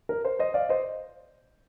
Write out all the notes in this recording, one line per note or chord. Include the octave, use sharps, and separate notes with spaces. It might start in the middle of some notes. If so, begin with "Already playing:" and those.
A#4
C5
C5 D#5
D5 F5
C5 D#5